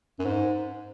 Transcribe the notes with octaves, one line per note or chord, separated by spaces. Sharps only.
F#2
G#2